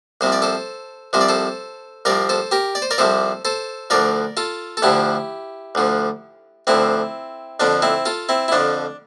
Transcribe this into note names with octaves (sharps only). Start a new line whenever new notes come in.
C2 C3 F3 C5
D5
A4 C5
C2 C3 F3 C5
D5
A4 C5
C2 C3 F3 A#4 D5
A4 C5
G4 A#4
D5
C5
A#4 D5
C2 C3 F3 A4 C5
A4 C5
D2 D3 F3 A#4 D5
F4 A4
A4
D2 D3 F3 E4 G4
D2 D3 F3
D2 D3 F3 C4 E4
F2 D3 F3 D4
C4 E4
F4 A4
C4 E4
E4
F2 D3 F3 D4